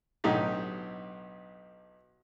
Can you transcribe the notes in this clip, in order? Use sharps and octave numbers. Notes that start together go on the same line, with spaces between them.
B1 A2 D3 D#4 G4